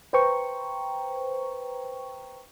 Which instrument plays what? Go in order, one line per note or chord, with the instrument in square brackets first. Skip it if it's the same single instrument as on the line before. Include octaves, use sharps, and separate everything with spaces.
[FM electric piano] B4 C5 G5 A#5 C#6